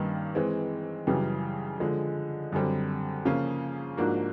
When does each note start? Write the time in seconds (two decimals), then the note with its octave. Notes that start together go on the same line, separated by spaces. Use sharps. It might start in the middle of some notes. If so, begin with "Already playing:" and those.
Already playing: G2 D#3 G3 A#3 C#4
0.35 E3 G#3 C4
1.07 F#2 C#3 E3 G3
1.80 D3 F3 G#3
2.52 F#2 D3 G3 C4
3.25 C#3 F3 A#3 C#4 F4
3.97 G#2 F3 A#3 D4 F#4